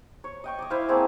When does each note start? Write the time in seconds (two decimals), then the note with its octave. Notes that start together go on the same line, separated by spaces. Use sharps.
0.24 C#5
0.44 D#5 G5 C#6
0.59 D5 D#5
0.70 E4 C5 F5
0.89 A3 A#3 C4 G#4